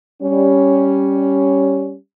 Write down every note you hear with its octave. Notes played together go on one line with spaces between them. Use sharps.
G3 C#4